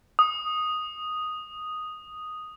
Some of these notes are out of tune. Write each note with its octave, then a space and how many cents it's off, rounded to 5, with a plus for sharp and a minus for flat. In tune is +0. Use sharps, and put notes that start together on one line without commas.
D#6 +0